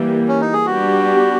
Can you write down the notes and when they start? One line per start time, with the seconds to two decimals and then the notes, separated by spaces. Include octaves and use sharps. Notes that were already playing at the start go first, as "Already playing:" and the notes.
Already playing: E3 G3 A#3
0.28 C#4
0.41 D#4
0.53 G#4
0.66 G3 B3 D4 F#4 G4